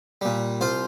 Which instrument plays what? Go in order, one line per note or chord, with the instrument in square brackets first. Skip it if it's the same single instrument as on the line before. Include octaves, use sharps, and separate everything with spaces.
[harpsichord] A#2 G3
C2 F4 C5